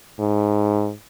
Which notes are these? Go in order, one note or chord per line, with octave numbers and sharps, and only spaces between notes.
G#2